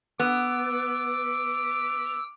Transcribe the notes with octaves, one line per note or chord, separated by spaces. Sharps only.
B3 D6 E6